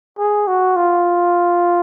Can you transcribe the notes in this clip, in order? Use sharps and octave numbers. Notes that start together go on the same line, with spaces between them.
G#4
F#4
F4